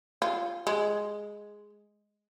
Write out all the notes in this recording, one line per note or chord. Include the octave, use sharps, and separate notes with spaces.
F4
G#3